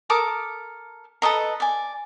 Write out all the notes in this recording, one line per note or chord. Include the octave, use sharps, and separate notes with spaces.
A4 A#4 D6 D#6
A4 B4 D#5 A#5
D5 G#5